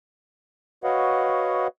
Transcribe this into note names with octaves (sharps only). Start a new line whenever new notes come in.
F#4 B4 C#5 D#5 F5 F#5